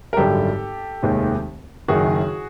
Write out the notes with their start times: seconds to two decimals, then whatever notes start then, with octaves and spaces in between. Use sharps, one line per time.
0.13 A#4
0.17 G#1 F#2 D3 G3 G4 A4
1.03 F1 D#2 D#3 G#3
1.88 F#1 F#2 D#3 F#4 G#4